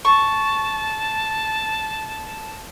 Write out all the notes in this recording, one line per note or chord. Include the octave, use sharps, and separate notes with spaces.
A5 C#6